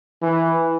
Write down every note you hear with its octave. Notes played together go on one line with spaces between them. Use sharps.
E3